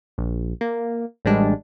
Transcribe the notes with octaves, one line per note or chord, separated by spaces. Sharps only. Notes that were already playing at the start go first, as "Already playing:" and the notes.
A#1
A#3
A1 G3 G#3 D4